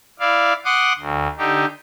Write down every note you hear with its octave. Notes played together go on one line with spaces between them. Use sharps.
E4 D5 F5
F#5 C6 D6 D#6
D2
D3 D#4 G4